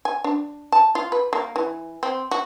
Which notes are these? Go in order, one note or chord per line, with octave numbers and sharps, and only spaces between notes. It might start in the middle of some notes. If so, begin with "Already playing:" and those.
G#5
D4
A5
F4
B4
A#3
E3
C4
F#4